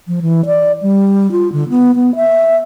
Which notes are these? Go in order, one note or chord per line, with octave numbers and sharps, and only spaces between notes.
F3
E3
D5
G3
F4
D3
B3
B3
E5